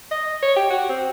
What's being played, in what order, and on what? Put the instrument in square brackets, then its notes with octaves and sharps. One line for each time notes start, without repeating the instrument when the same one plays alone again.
[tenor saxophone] D#5
C#5
G4
F#4
C4